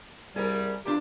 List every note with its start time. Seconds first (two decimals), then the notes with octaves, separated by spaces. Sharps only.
0.36 C2 G3 G#4 A#4
0.86 E2 A#3 D4 F4 G4